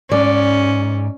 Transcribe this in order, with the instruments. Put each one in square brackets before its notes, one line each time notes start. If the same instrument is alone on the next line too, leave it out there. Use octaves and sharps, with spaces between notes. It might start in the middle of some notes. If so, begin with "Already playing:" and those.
[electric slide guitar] G#2 [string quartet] C#4 [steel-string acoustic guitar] D5